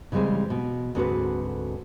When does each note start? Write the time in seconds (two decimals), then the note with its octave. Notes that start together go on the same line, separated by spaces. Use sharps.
0.12 C#3 E3 G3 G#3 C4
0.50 B2
0.95 D2 G#2 C4 F#4 A4 B4